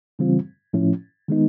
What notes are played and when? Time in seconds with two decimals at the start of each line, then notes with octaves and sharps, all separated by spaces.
0.19 C#3 E3 G3 C4 F4
0.73 A2 F3 A3 C#4 E4
1.28 D#3 G#3 B3 D#4